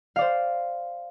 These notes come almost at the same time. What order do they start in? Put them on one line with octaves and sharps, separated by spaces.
F5 D5 C5